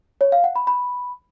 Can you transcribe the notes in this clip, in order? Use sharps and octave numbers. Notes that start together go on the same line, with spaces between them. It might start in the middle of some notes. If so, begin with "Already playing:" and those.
C#5
F5
F#5
B5
B5